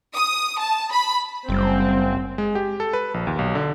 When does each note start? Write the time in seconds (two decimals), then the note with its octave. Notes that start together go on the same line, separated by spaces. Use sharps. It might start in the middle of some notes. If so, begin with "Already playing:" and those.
0.16 D#6
0.59 A5
0.92 B5
1.49 F#1 G3 C4
2.38 G#3
2.55 G4
2.80 A4
2.93 B4
3.14 A#1
3.27 D#2
3.39 B1
3.55 D3